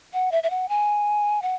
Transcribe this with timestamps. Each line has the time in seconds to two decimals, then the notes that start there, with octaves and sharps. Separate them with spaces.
0.13 F#5
0.32 E5
0.43 E5
0.50 F#5
0.69 G#5
1.42 F#5